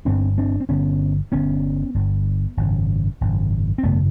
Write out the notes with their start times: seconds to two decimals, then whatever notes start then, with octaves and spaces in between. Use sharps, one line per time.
0.05 G1 G2 D3 C4 D4
0.38 C4 D4
0.60 C4
0.69 G1 G2 D3 B3 C#4
1.32 G1 G2 D3 B3 C#4
1.94 G1 G2 D3
2.57 G#1 F#2 C#3
3.21 G#1 F#2 C#3
3.78 C4
3.83 G#1 F#2 C#3 A3 B3